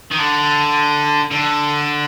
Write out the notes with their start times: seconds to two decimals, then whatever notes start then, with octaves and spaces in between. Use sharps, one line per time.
0.12 D#3
0.19 D3
1.31 D3